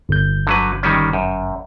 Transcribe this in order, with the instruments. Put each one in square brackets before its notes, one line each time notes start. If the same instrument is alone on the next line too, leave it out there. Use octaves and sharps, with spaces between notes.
[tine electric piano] G1 G6
[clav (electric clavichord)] D3 F#3 B4
D#3 G3 C#4
F#2